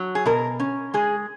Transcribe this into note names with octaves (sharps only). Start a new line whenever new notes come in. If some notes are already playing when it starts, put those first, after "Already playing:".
Already playing: F#3
G#4
B2 A#4
C#4
G#3 G#4